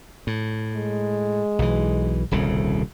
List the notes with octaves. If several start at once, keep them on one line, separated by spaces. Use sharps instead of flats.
A2
G#3
B1 E3
D#1 C2 C#3